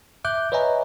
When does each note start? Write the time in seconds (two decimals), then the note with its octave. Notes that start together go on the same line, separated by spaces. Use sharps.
0.25 E5 D6 F#6 G6
0.52 B4 C#5 D#5 E5 G#5 A#5